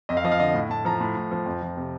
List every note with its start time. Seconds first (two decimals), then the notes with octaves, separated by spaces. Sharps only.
0.09 F2 D#5
0.17 F5
0.24 F3 D#5
0.32 F5
0.40 D3 D#5
0.54 A2
0.70 A2 A5
0.85 F3 A#5
1.00 A2
1.16 A2
1.31 F3
1.46 F2
1.62 F3
1.77 C3